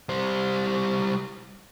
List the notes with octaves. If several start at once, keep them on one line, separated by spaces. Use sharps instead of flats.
G3 C5